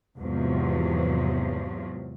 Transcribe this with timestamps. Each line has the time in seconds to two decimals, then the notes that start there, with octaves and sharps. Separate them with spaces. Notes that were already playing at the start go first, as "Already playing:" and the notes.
0.18 E2 G#2 C3 F3 F#3